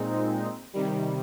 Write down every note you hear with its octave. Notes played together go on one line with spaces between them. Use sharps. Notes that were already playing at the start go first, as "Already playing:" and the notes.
Already playing: A#2 G#3 C4 D#4
C3 D#3 G3